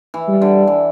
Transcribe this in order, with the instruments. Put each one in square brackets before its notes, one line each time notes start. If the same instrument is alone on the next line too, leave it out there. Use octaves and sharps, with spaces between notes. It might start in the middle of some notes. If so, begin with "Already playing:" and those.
[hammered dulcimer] E3
[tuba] G3
[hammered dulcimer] D3
E3